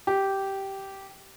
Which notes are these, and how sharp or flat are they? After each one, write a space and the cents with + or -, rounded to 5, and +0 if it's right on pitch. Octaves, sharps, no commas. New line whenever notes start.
G4 -10